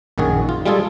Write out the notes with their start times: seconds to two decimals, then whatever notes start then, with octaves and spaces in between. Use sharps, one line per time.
0.18 A#1 F#2 D#3 F#4 G#4
0.49 F4
0.66 G3 G#3 F4 G#4 A4